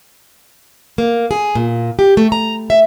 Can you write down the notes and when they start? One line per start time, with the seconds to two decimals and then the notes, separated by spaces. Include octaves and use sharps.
0.98 A#3
1.31 G#4
1.55 A#2
1.99 G4
2.17 A3
2.32 A#5
2.70 E5